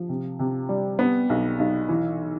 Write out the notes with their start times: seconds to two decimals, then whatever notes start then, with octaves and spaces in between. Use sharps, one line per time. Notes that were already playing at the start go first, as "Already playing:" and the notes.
Already playing: F3
0.09 C3
0.39 C3
0.69 G3
0.99 B3
1.30 B1
1.59 B1
1.89 E3